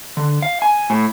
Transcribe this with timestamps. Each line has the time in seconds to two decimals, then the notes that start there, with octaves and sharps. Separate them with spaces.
0.17 D3
0.42 F5
0.62 G#5
0.90 A2